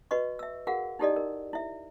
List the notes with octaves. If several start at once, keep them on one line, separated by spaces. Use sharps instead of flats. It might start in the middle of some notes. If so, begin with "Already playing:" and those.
F#4 B4 D#5 C#6
E5 E6
F#4 G#4 A#4 F5 F#5
D#4 E4 G4 A4 D5 D#5
A#4
E4 E5